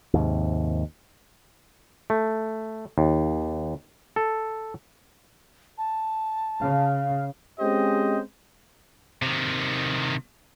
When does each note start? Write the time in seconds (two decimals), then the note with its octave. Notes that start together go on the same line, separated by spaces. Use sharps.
0.13 D#2 G#2 C3
2.10 A3
2.98 D#2
4.16 A4
5.78 A5
6.61 C#3 F5
7.60 G#3 C4 C#4 G4 C5 D#5
9.22 C3 D#3